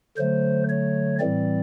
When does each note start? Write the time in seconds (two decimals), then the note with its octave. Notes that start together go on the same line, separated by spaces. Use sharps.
0.17 D3 F#3 A3 C5
0.69 C#5
1.19 A2 E3 G3 C4 D5